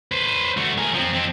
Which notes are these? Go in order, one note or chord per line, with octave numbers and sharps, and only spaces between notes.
B4 C5
A3 F#4
G#4 A#4
F3 C4
F2 C4